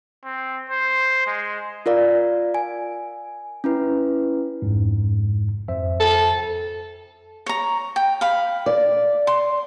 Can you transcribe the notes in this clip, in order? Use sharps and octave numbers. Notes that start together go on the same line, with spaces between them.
C4
C5
G#3
F4 A#4 D5 F5
G#5
C#4 E4 B4
A1 F2 G#2
F2 C5 E5
A4
C#5 A#5
G5
F5 B5
D5
C6